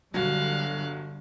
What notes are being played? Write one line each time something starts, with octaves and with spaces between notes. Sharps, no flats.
G1 D3 F#3 G3 F5 F#6